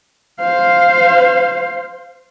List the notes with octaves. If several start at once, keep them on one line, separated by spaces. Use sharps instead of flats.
C5 F5